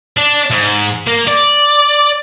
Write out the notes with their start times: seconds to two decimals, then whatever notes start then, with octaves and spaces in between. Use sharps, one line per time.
0.17 D4
0.51 G#2
1.07 A#3
1.27 D5